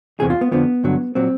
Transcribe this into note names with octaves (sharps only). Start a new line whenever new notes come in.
E2 C3 E3 G#4
F4
B3
F2 D3 F3 B3
G2 D3 F#3
A#2 F#3 C4